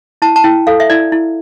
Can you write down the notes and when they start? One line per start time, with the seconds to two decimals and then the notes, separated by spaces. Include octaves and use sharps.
0.22 E4 A5
0.36 A5
0.44 E4 G5
0.67 A4 F5
0.80 E5
0.90 E4 D5
1.12 E4